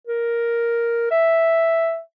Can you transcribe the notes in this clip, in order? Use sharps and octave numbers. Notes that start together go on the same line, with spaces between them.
A#4
E5